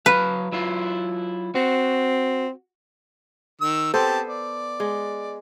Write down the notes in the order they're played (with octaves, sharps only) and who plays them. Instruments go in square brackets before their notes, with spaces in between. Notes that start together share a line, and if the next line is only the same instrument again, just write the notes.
[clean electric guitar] F#3 F5 [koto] B4
[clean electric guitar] F#3 E4 F4
[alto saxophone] C4 [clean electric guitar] F#4
[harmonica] D#3 E6
[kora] B3 A4 C5 [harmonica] C4 G4 A5
[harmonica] D5
[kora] G#3